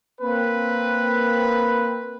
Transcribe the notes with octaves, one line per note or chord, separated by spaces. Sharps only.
A#3 C4 B4